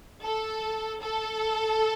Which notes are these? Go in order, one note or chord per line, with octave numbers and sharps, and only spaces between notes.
A4
A4